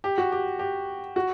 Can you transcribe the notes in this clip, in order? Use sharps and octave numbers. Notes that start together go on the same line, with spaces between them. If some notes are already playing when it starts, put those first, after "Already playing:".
G4
F#4
G4
G4
F#4